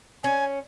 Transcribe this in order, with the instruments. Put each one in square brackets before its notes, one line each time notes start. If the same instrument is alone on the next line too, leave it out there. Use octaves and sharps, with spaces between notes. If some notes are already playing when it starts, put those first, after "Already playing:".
[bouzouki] C#4 [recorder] G#5